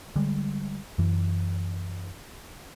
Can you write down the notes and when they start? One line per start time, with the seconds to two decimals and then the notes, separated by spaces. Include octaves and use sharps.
0.16 D3 G3 G#3
0.98 F#2 E3